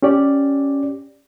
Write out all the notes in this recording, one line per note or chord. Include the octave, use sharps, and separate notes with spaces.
C#4 G4 D5